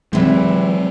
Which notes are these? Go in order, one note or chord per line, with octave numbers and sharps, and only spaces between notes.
C3 E3 F#3 G#3